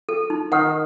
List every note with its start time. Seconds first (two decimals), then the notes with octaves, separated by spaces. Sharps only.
0.09 A4
0.30 D#4
0.52 D#3 F#5